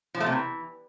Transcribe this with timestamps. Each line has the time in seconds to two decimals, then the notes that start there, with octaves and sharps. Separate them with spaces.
0.14 F3
0.20 A3
0.26 C3
0.32 E3